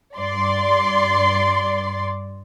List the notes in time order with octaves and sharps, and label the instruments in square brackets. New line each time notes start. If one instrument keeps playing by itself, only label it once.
[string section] G2 D5 C6